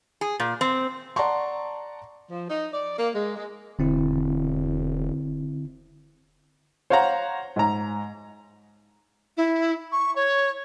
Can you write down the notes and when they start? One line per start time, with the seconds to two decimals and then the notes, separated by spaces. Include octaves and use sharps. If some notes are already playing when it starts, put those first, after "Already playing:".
0.21 G#4
0.40 A#2
0.61 C4
1.16 D5 F#5 A5 A#5 C6 C#6
2.31 F3
2.50 D#4
2.74 D5
2.98 A#3
3.14 G#3
3.36 G#3
3.79 E1 D3 C4 E4
6.90 C5 C#5 F5 F#5 A#5
7.56 G#2 A#5
9.37 E4
9.92 C#6
10.16 C#5